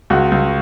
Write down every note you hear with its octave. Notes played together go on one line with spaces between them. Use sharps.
C#2 F#4
C#2